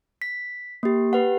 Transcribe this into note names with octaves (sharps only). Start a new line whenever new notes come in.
B6
A#3 G4
G4 B4 F#5